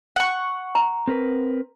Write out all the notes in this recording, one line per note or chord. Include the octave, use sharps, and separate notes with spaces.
F#5 C#6
A#5
C4 A#4 B4